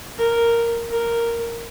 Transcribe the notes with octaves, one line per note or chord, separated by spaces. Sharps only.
A#4
A#4